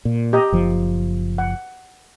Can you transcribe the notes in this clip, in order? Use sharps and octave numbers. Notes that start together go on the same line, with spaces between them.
A#2
G4 D#5 A#5
F#1 F3
F#5